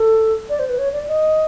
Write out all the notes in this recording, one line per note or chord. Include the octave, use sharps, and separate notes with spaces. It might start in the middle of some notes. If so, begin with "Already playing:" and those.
Already playing: A4
D5
C5
B4
C#5
D5
D#5